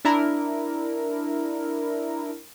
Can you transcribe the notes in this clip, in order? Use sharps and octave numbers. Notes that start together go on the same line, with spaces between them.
D4 E4 A#4